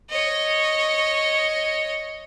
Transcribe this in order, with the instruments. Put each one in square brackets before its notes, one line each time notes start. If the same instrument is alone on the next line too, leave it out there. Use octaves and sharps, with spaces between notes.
[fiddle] C#5 D#5